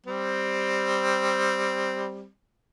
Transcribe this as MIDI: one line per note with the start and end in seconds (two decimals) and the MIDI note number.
0.06 2.28 55
0.06 2.28 60